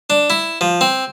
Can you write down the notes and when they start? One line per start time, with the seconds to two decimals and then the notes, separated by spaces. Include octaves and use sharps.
0.10 D4
0.30 E4
0.61 F3
0.81 C4